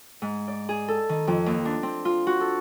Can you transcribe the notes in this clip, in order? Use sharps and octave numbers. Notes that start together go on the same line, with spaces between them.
G#2
D5
G#4
A4
D#3
F2
D#2
D4
C4
F4
F#4
A4